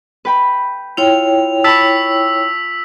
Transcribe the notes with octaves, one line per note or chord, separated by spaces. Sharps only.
B4 G5 B5
E4 F4 C#5 G5 F7
A5 B5 C#6 E6 B6